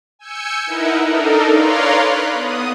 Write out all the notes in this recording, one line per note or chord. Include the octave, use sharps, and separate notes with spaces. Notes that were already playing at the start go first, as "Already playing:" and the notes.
G#5 E6 G6 C#7
D#4 E4 A#4 B4 E5 F#5
D4 D#4 A4 A#4
B4 C#5 D5 F5 A#5 C6
B5 F#6
B3 D#6